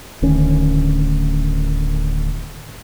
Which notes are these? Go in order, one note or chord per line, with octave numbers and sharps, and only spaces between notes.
D1 D2 D#3 C#4